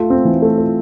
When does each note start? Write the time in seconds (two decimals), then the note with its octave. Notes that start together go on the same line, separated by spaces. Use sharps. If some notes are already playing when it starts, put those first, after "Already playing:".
Already playing: A3 F4
0.10 C4
0.25 E3
0.42 A3
0.57 F4